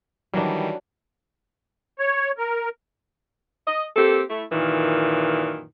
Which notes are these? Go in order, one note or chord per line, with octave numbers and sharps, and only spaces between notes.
D#3 E3 F#3 G3 D4
C#5
A#4
D#5
A#3 C4 G4 A4
A3 E4
F#2 A#2 D#3 E3